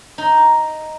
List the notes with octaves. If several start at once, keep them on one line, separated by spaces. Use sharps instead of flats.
D#4